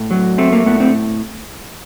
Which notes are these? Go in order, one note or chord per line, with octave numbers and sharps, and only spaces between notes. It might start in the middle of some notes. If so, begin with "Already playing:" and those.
Already playing: A2
F#3
A3 C4
A#3
A2 B3
C4